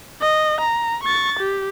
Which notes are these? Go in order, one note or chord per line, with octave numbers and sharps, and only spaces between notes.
D#5
A#5
C#6 A6
G4